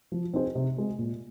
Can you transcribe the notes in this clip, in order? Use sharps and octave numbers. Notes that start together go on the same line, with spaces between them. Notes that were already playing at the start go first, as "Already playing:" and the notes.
F3
C4 D#4 G#4 C5
C3
G#3 C4
A#2